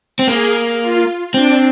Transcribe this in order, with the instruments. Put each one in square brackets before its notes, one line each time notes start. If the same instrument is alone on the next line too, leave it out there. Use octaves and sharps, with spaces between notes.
[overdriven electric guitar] C4
[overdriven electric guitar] A#3 [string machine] G#4
[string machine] F4
[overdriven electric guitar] C4 [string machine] D4